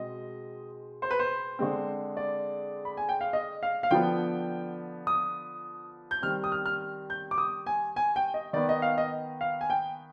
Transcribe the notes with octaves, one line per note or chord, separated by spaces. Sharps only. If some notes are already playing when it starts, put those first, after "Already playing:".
Already playing: B2 G#3 C4 D#5
C5
B4
C5
D3 G#3 C4
D5
B5
G#5
G5
F5
D#5
F5
F5
D3 F3 B3 G5
D#6
G6
D#3 G3 C4 F6
D#6
F6
F6
G6
D6
D#6
G#5
G#5
G5
D#5
D#3 B3 D5
D#5
F5
D#5
F5
G#5
G5